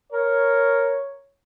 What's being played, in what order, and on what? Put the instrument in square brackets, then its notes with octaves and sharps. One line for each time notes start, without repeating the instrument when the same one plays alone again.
[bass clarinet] A#4 [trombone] C#5